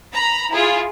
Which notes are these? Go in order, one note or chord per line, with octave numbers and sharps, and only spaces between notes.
A#5 B5
E4 F4 G#4